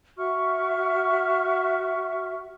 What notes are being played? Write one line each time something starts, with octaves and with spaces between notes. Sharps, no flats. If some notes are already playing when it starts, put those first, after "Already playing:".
F#4 E5 C#6 F6